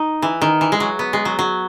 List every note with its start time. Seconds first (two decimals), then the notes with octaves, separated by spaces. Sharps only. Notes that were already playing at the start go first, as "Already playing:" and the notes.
Already playing: D#4
0.22 E3
0.42 D#3
0.61 E3
0.72 G#3
0.80 F#3
0.99 B3
1.13 G#3
1.25 F#3
1.39 F#3